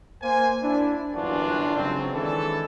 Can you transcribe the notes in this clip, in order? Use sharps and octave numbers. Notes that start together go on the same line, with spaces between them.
A#3 C5 G#5
D4 E4
G1 F#2 E3 D4 F4 F#4
C#3 F#3 G#3 C4
D#3 E3 G#3 D4 A4